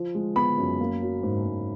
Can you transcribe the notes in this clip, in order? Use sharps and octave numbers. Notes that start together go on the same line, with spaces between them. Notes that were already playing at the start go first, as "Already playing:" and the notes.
Already playing: F3
G#3
B3 B5
F#2
A#3
F#3
G#2
G#2